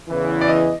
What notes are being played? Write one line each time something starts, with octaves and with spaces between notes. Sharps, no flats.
E2 C#3 E3
D5
D#5